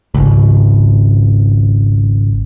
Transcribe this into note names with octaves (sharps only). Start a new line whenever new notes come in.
G#1 C#2